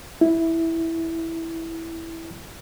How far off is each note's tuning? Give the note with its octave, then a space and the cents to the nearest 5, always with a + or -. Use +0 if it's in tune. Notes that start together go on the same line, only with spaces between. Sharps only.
E4 -5